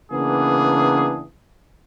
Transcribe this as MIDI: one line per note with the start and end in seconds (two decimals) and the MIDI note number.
0.12 1.25 49
0.12 1.25 52
0.12 1.25 58
0.12 1.25 59
0.12 1.25 62
0.12 1.25 68